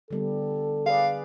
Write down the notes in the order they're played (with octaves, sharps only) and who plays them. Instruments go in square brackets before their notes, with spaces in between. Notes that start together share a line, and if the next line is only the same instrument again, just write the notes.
[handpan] D3 G3 B3 [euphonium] A4
[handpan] G#4 B4 D5 [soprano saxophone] F5